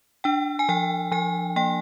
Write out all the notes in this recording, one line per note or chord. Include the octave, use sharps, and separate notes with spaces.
D4 G5
G#5
F3 G5
F3 G#5
A#3 G5